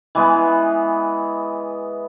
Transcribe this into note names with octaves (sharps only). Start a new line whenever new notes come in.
E3 G#3 B3